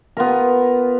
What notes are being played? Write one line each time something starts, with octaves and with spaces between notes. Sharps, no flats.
B3 F4 A#4